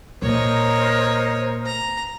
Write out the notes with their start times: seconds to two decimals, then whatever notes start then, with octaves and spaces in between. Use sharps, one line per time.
0.22 A#2 A#4 C5 C#5 D#5
1.66 A#5